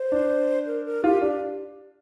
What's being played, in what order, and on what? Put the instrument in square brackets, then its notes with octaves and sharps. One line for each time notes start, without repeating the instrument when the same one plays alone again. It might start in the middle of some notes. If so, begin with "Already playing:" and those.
Already playing: [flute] C5
[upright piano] D4
[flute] A#4
A#4
[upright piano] F4 [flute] G4
[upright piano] D4 [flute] G4